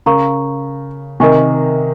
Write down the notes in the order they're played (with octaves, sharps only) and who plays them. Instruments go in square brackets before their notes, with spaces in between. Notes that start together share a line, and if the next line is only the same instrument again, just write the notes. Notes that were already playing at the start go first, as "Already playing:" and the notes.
[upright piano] C#3 [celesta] A#4 F5 A#5 C#6
[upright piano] C3 D#3 [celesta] A#4 D#5 G#5 C#6